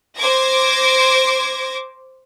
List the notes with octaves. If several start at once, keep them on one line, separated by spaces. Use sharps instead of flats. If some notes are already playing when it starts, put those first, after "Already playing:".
C5 D6 G#6 A#6